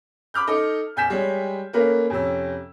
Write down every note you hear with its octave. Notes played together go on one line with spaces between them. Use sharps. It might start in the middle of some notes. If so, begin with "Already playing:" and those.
B5 D6 F6 G6
D#4 A4 D#5 D6
E1 G#5 G6 B6 E7
G3 G#3 C#5
A3 A#3 C#4 A#4 B4
F2 C3 C#4 E6